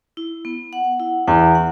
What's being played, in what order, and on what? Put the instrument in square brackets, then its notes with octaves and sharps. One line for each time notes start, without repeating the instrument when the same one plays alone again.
[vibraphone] E4
B3
F#5
E4
[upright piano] E2 [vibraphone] F#5
[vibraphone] F#5